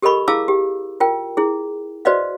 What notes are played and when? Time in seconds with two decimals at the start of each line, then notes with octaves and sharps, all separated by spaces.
0.02 G4 A4 A#4 D#5 B5 C#6
0.28 E4 G#4 F5 A5 D6 E6
0.48 G4
1.00 F4 A#4 G5
1.37 E4 G#4
2.05 F#4 B4 C5 D5 D#5 F5